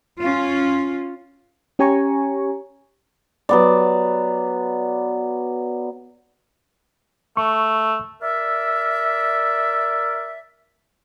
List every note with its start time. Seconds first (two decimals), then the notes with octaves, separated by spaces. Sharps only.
0.21 C#4 F4
1.79 C#4 G4 C#5 G#5 A#5 C#6
3.49 F#3 B3 D5
7.37 A3 C#6
8.22 A#4 D5 E5